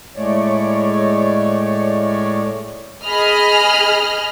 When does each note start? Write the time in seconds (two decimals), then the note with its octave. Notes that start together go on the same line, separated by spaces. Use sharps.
0.16 A2 G#3 A3 C#5 D5
3.05 G#4 D#5 B5 F6